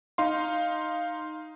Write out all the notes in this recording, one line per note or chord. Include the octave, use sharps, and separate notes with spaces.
D#4 F5 C6